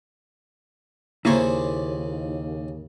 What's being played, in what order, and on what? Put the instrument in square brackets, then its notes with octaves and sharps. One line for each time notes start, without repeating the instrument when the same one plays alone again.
[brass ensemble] D#2 [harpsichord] C#3 D5 G#5 [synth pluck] A#3 C#6 [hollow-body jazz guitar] E4 C5